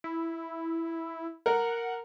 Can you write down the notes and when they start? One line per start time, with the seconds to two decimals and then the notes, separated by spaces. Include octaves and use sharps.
0.04 E4
1.46 A#4 F#5